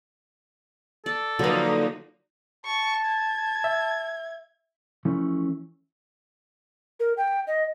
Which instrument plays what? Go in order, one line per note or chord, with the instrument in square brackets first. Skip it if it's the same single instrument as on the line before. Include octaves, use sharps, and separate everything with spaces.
[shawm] A4 [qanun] D5
[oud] D3 B4 [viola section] F3 A#3 D#4 [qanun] F#3
[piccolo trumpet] A5 [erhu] C#6
[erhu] G#6
[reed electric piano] E5
[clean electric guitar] E3 F3 A3 C#4
[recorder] A#4
G5
D#5